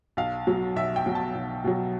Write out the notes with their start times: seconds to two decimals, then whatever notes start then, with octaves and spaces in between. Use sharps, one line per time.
0.17 B1 F5
0.47 B2 F#3
0.76 B1 E5
0.96 G5
1.06 B2 F#3
1.15 A5
1.35 B1
1.64 B2 F#3